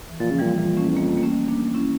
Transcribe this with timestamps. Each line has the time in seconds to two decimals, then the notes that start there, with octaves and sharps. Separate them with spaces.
0.10 E3
0.20 A#2 F3
0.31 C#3
0.38 A#2 E3 G3
0.58 A#2 E3 G3
0.77 A3 C#4
0.88 E2
0.97 F2 G3 A#3
1.17 A#3
1.23 A3 C#4
1.48 A#3 D4
1.74 C#4 E4